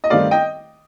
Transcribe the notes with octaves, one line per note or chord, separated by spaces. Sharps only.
D#5
G2 D#3 A3 C4 D5 F5
D#5 G5